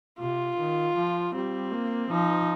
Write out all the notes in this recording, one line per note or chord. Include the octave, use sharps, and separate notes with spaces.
C3 F4
D#3
F3
G3 C4
A#3
F3 D#4